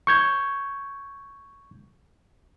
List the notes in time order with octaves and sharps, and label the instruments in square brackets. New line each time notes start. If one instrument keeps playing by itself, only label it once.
[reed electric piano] C#6 G6 G#6